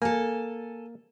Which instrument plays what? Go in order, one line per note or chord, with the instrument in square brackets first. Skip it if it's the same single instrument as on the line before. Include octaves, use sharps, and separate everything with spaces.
[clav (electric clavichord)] A#3 [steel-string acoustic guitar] A4 G#5